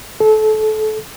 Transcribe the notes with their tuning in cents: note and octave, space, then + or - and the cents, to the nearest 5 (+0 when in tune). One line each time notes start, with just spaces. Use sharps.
A4 -25